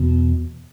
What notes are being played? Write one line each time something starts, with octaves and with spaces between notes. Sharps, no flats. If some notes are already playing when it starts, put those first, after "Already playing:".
Already playing: E2 B2